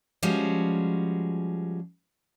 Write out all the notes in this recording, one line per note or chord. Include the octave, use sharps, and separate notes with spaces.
F3 G3 G#3 C#4 F#4